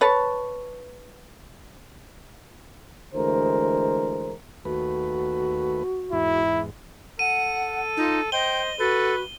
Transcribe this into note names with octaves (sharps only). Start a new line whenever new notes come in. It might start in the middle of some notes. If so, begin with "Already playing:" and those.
B4 C#5 A5
D2 E3 G#3 A#4 C5
D#2 A3 F#4 B4
E2 G#2 E4
A4 F#5 D#7
D#4 F4
C5 D#5 G5 G7
F#4 A4 B4